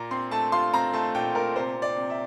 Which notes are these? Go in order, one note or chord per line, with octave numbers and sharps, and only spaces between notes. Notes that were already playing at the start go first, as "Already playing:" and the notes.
Already playing: A#2 A#5
C4 C6
A3 A5
F4 C6
C4 A#5
A3 A5
A#2 G5
A#2 A#4
C3 C5
C3
D5
C3
E5